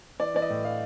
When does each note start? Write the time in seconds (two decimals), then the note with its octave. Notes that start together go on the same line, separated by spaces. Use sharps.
0.20 E3 D5
0.34 E3 D5
0.42 D#5
0.50 A2
0.65 E3 F5